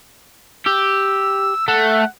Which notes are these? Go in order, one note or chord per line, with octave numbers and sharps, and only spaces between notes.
G4 E6
A3 F#5